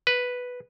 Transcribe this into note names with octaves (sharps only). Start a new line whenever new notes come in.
B4